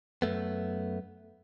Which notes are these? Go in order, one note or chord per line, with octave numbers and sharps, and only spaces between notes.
F#2 A3 B3